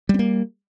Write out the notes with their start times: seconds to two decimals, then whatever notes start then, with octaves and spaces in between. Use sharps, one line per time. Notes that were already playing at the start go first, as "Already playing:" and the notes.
0.09 G3
0.14 C4
0.19 A#3